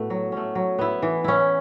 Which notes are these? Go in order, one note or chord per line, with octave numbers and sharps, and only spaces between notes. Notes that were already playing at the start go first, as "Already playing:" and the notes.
Already playing: A2 A3 B3 F#4
F#3
A3 C#4
F#3
B3 E4
E3
C#4 E4